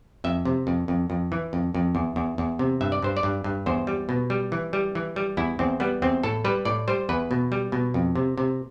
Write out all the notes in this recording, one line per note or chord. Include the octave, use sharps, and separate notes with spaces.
F2 E5
C3
F2
F2
F2
E3
F2
F2
E2
E2
E2
C3
G2 E5
D5
G2 C5
D5
G2
G2
E2 C5
G3
B2
G3
E3
G3
E3
G3
E2 E4
E2 C4
G3 B3
E2 C4
A2 A4
G3 B4
A2 D5
G3 C5
E2 B4
B2
G3
B2
F2
C3
C3